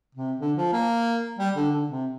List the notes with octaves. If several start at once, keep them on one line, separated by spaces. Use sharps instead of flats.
C3
D3
F3
A#3
G3
D3
D3
C3